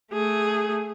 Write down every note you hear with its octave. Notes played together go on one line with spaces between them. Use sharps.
A3 G#4